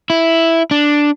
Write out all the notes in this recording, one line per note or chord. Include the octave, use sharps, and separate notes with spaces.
E4
D4